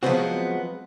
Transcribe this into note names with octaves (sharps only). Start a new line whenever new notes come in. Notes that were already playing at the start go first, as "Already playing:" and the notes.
F3 F#3 G#3 B3 C4 F#4